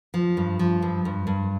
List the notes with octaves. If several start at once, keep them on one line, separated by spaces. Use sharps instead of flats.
F3
G2
F3
G2
G2
G2